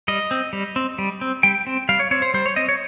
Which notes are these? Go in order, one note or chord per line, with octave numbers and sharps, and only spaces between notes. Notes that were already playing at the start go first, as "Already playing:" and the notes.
G3 D#5
C4
G3
C4
G3
C4
G3 G5
C4
G3 F5
C#5
C4 C#5
C5
G3 C5
C#5
C4 D#5
C#5